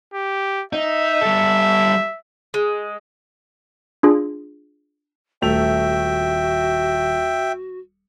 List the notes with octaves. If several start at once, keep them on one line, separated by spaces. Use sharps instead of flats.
G4
D#4 E5
G3 A4
G#3
D4 F4 G#4
D#1 A3 F#4 E5 G5 F7